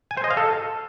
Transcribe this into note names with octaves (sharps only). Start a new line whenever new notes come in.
G#5
C5
D#5
F5
A4